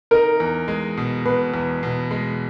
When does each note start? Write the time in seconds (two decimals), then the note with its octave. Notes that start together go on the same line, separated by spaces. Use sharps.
0.11 D#4 A#4
0.40 E2
0.68 G#3
0.97 B2
1.25 B2 B4
1.54 E2
1.83 B2
2.11 G#3